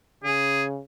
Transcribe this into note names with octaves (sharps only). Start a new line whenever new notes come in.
C#3 G#4